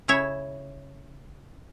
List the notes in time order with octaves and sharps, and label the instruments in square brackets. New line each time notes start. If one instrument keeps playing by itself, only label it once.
[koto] C#3 E4 C#5 E5